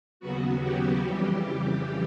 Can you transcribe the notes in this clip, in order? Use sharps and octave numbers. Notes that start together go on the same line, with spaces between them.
D#2 C#3 F#3 B3 F#4
G4
F2 C#3 E3 G3